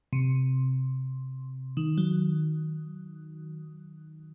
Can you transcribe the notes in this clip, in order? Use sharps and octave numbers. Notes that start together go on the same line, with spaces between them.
C3
D#3
F#3